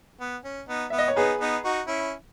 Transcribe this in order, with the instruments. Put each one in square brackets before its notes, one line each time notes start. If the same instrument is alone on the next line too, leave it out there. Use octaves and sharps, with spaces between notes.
[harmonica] B3
C#4
B3 D#4
[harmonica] B3 [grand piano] E5
[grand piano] D#5
C#5
[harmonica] B3 D#4 [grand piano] G#4 B4
[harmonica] B3 D#4
D#4 F#4
C#4 E4